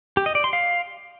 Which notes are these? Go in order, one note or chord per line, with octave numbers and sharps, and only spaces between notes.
G4
D#5
D5
C6
F5